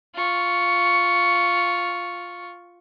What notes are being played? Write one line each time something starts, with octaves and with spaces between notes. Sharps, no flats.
F4 C#6